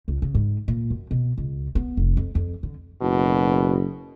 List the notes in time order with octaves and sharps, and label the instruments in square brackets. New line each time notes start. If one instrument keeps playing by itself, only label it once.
[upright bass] C#2
C#3
G#2
A#2
F#2
B2
C#2
B3
F1
F2
F2
D3
[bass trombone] F#1 [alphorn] B2